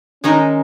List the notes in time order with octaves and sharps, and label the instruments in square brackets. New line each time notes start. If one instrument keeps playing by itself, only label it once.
[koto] D#3 G#3 D#4 G#4 [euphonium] C#4